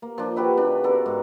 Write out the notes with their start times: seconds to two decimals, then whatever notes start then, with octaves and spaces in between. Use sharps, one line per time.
0.02 A#3
0.18 F3 D4
0.36 F#4 G4 B4 E5
0.57 C#3 D4
0.84 B3 A4 A#4
1.06 G#2